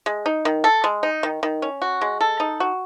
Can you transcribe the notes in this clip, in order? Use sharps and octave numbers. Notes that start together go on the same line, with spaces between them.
G#3
D#4
D#3
A4
G#3
D#4
D#3
D#3
C#4
F#4
G#3
A4
D#4
F#4